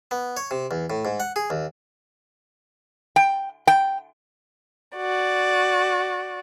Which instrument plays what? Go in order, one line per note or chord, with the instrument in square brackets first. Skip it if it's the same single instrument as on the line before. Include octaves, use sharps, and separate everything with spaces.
[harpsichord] B3
C#5
C3
E2
A2
G#2
F#5
G#4
D#2
[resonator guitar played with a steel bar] G5
G5
[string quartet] F#4 D5